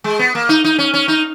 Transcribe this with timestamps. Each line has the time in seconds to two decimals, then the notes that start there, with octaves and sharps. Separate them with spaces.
0.04 G#3
0.19 B3
0.35 A#3
0.49 D#4
0.64 D#4
0.79 C#4
0.94 C#4
1.08 D#4